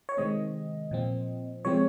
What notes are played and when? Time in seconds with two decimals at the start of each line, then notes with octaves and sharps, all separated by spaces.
0.09 C#5
0.17 C3 D#3 G#3 C4 D#5
0.91 A#2 F3 C4
1.65 C3 F3 G#3 C4 C#5